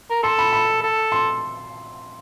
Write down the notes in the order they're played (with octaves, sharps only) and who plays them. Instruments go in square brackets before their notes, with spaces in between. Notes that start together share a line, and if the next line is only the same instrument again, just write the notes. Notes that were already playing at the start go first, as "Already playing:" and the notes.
[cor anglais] A#4
[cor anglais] A4 [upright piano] C6
[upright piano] B5
B5
[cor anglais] A4
[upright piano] C6